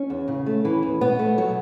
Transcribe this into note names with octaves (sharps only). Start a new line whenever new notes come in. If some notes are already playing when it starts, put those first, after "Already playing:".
Already playing: C#4
E2
C#3
A3
E3
E2
B2 B3
A3
F#3